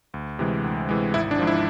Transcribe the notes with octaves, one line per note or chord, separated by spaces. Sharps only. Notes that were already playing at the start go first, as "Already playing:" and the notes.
D2
C3 E3 G#3
D2
C3 E3 G#3
G#1 E4
D4
G#2 F3
E4